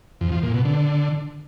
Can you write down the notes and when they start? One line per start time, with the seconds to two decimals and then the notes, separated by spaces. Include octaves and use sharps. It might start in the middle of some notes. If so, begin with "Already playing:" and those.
0.21 F2
0.32 F3
0.43 A#2
0.54 B2
0.65 D3